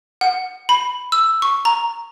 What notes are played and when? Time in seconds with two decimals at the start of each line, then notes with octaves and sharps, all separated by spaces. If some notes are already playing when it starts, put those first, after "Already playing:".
0.21 F#5
0.69 B5
1.12 E6
1.42 C#6
1.65 A#5